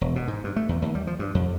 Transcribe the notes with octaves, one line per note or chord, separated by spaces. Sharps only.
E1
B2
G#2
G2
A3
E2
D#2
G3
F3
G2
F2